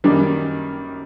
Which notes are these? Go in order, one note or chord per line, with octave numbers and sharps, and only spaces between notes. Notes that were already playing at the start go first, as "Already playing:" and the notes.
F#2 D#3 G3 A#3